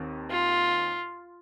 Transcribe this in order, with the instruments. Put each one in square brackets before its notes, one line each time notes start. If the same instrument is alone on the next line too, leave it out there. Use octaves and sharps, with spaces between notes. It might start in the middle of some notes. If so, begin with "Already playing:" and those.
Already playing: [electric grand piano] D#2 D#3 C4
[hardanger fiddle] F4